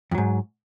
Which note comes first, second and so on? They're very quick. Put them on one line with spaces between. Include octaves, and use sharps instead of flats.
F2 F#3 G#2